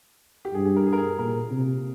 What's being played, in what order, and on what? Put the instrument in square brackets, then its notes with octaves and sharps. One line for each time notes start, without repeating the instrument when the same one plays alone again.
[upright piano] G4
[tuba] G2 [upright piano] G#4
[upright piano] G#4
A#4
G#4
A#4
G#4
[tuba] A#2 [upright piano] A#4
[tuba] C3